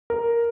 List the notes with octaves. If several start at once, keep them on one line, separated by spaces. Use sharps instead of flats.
A#4